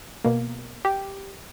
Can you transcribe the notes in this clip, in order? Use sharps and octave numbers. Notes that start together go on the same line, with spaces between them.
B2 A#3
G4